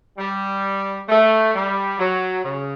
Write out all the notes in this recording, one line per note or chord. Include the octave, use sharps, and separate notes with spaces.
G3
A3
G3
F#3
C#3